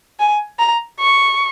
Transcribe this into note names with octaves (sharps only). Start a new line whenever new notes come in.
G#5
A#5
C#6